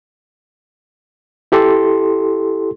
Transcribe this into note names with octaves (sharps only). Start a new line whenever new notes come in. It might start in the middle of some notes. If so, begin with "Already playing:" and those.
E4 G4 A4 C6